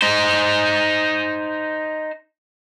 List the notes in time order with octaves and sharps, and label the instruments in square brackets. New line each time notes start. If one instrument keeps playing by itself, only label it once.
[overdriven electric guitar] D#4 C5